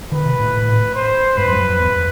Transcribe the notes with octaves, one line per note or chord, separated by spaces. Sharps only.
D#3 B4
C3
A2
C5
G2 B4
F#2
F#2
F#2
E2